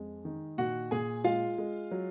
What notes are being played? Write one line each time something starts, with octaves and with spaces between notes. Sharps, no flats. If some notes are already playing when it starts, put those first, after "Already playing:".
Already playing: F2 G#3
D#3
A#2 F#4 F#5
A#2 G#4 G#5
G#3 F4 F5
G#3
F#3